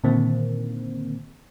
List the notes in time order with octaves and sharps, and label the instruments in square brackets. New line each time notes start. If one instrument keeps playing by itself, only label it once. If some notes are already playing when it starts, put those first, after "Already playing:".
[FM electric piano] A#2 D3 D#3 A#3 C4